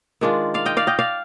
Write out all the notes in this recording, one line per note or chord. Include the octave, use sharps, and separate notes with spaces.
D#3 G#3 D4 F4
D5 F5
D#5 G5
D5 F5
D#5 G5
D5 F5